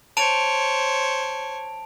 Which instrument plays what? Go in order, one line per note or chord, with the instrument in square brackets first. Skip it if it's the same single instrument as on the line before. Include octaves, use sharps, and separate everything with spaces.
[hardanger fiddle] C5 C#5 [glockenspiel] A5 D7 F7